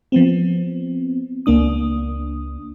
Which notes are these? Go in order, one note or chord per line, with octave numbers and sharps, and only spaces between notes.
F3 B3 C4
C#2 A#3 D4 D#6